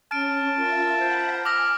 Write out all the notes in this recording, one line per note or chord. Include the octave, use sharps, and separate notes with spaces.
C#4 A5 F6 D7
F4 A#4 E5
C5 F#5 A#5 B5
G#5 D6 E6 F6 A#6